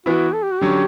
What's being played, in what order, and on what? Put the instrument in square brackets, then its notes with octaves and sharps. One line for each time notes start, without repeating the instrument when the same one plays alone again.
[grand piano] E3 B3 E4 [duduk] F#4
[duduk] A4
G4
F#4
[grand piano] D3 F#3 C#4 [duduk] G4